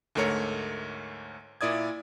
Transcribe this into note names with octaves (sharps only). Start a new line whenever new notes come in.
D2 G#2 A3 A#4 C#5 C#7
A#2 E4 D5 D#6 G#6